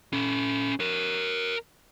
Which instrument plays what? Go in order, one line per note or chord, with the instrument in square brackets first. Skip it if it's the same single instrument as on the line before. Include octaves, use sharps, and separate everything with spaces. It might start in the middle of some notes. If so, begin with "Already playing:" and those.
[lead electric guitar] C#4 A4
A#4 C#5